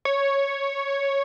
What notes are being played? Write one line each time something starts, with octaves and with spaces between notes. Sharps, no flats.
C#5